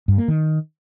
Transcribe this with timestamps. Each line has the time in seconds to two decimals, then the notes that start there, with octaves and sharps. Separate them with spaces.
0.08 G2
0.18 A#3
0.28 D#3